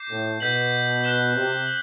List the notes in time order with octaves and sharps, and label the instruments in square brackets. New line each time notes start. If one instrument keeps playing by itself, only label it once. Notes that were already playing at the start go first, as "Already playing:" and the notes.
Already playing: [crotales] D6 G6 C7
[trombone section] A2
[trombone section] B2 [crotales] G6 B6 F#7
[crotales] F#6 B6 E7 G7
[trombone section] C3
[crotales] F#7